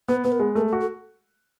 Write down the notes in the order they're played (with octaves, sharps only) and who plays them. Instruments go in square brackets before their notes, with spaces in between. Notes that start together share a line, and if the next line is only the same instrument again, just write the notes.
[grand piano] B3 [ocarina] B4
[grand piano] B3 [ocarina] B4
[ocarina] A#4
[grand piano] G#3
[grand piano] A3 [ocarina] A#4
[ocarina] A4
[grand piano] F#4
[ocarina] A4